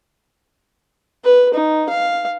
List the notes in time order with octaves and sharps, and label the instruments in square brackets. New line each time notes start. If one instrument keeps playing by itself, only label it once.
[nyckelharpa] B4
D#4
F5